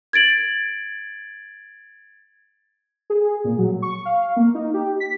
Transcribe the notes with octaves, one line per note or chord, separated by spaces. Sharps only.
G#6 A6 D7 F#7
G#4
A#2
F#3
C#6
F5
A#3
D#4
G4
B6